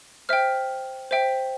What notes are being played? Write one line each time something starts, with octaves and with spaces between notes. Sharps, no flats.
C5 E5 G5 F6
C5 E5 G5